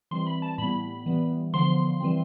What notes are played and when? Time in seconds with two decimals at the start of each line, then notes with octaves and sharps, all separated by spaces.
0.11 E3 G3 C4 C6
0.26 B5
0.42 A5
0.58 A2 G3 B3 B5
1.06 E3 G3 B3
1.53 D3 F3 B3 C6
2.00 E3 G3 C4